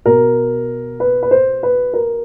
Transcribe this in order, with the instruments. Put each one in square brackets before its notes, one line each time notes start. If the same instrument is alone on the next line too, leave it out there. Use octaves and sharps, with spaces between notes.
[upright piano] B2 A#4
B4
B4
C5
B4
A#4